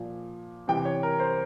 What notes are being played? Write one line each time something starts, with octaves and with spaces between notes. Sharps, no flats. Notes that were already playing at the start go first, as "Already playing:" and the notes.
Already playing: A#2 F3
C3 E3 G5
C#5
A#4
C5